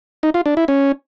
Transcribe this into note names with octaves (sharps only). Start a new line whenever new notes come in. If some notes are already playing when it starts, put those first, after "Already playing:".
D#4
F4
D4
E4
C#4